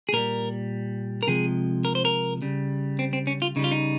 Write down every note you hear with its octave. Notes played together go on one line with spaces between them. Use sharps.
G#4
A#2 G3 A#4
A#4
C3 F3 G#3 G#4
A#4
C5
A#4
C#3 G3
C4
C4
C#4
F4
C#3 G3 D#4
F4
D#4